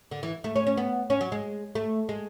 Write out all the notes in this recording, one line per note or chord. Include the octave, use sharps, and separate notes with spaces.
D3
E3
A3
C#4
C#4
B3
C#4
F#3
G#3
A3
G#3